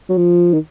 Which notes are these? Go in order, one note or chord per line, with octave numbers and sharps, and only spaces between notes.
F#3
F3
D#3